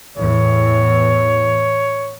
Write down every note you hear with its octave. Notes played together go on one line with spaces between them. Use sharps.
E2 A2 E3 C#5